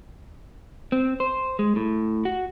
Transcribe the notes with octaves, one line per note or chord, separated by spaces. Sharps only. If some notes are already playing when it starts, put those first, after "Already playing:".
C4
C5
G#3
A2
F#4